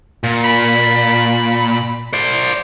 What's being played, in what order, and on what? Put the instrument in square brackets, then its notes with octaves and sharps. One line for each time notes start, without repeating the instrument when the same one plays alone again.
[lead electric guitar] A#2
[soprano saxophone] B5
[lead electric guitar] C5 D5